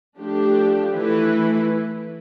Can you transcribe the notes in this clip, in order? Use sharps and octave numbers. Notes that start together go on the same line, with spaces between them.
F3 A3 D4 G4
E3 A3 E4 B4